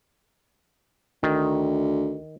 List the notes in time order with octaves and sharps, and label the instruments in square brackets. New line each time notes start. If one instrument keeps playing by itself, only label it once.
[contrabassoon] D2 [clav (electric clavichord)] D#3